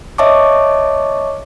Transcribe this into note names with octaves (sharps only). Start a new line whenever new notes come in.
C#5 D#5 E5 A5 C#6 D6